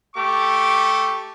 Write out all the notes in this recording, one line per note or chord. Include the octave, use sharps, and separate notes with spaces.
A3 G4 C#6 D6